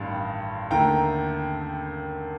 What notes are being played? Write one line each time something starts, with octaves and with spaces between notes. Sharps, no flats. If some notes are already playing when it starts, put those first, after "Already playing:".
Already playing: A1 G2 D#3 G3 F5
D#2 D3 A3 G5 A#5